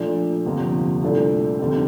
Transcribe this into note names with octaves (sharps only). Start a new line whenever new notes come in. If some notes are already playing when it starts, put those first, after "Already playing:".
Already playing: A#2 F3 A3 D4
G1 F2 C3 F3 A#3
C2 A#2 A3 D4 A4
F1 D#2 D3 G3 C4